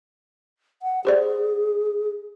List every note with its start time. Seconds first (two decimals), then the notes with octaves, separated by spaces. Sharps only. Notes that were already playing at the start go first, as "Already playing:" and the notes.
0.82 F#5
1.05 G4 G#4 C5 D5